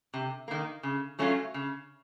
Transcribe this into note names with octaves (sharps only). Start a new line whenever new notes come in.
C3
D#3 A#3
C#3
F#3 A3 C#4 F4
C#3